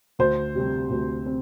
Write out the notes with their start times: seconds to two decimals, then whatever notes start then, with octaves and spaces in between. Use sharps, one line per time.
0.19 D2 C5
0.55 C3 G3 C4
0.90 D2
1.26 C4